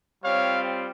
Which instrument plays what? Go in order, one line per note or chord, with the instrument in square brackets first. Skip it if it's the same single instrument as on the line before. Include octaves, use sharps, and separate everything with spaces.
[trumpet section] G3 C4 F4 C#5 F5